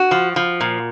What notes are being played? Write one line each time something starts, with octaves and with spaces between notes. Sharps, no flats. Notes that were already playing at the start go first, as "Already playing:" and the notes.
Already playing: F#4
F3
F3
A#2